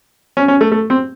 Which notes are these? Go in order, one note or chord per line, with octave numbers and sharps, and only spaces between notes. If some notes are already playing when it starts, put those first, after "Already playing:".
C#4
C#4
A3
A3
C4